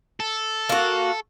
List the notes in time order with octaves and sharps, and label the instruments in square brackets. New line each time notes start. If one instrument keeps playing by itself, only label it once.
[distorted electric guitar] A4
[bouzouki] A#3 F#4